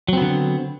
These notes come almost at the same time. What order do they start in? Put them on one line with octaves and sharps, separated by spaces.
F#3 C4 B3 D3